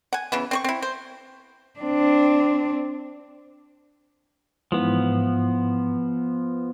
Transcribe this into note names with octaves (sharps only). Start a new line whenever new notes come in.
F#5 G#5
C#3 E3 B3
C4 C5 C#6
C4 E4
C5
C4 D4
G#2 E3 F3 B3